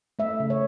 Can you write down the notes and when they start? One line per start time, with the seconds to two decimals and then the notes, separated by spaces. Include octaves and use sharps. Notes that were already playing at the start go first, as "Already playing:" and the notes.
0.19 A3 E5
0.40 C#3
0.50 C#5